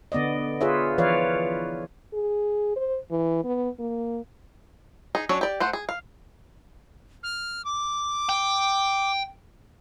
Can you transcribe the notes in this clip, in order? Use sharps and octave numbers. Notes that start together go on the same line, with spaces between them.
D3 B3 D5 D#5
F4 G#4 B4 C#5 E5
E3 F3 B4 C#5 D5 F5
G#4
C5
E3
B3
A#3
D#4 G#4
F#3 C#4 D4 C#5
G4 D5
A3 C5 F#5
G#4
F5
F6
D6
G5